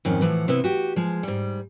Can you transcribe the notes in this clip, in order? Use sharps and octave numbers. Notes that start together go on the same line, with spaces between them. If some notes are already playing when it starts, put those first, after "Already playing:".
F2 G#2 D#3 C#4
A2 E3 F3 F#5
C3 B3 E4
F#4 G4
F3 G#3
G#2 G3